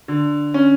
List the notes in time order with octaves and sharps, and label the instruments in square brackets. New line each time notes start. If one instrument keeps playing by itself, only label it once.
[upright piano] D3
C#4